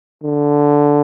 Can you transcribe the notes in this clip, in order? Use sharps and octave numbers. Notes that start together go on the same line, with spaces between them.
D3